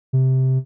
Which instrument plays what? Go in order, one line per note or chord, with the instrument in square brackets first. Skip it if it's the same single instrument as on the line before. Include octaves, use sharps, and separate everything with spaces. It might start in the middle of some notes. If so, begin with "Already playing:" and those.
[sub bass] C3